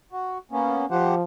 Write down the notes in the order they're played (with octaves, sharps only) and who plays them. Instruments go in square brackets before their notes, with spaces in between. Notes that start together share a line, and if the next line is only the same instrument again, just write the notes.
[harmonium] F#4
A#3 B3 C#4
[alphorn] F3 [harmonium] G4 C5 F#5